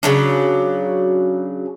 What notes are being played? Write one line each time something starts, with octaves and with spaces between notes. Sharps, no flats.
C#3 F#3 D4